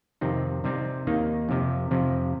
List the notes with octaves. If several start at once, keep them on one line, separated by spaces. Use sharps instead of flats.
F2 C3 D#3 C4 D#4
C3 G3 C4 D#4
D#2 D#3 A#3 D#4
F2 C3 F3
F2 C3 F3